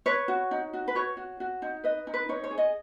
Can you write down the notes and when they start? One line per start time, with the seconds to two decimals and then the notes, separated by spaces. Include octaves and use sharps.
0.06 B4 C#5
0.28 F#4
0.51 D#4
0.73 F#4
0.88 B4
0.95 F#4 C#5
1.17 F#4
1.40 F#4
1.62 D#4
1.84 B4 D#5
2.07 D#4
2.14 B4
2.29 D#4 C#5
2.44 C#5
2.51 G#4
2.58 D#5